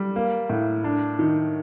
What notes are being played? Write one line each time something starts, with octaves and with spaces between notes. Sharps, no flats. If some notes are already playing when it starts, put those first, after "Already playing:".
Already playing: G3
A#3
A2
D4
D#3